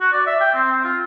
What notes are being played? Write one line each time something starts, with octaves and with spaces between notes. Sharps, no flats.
F#4
D5
E5
G5
C4
C4
F4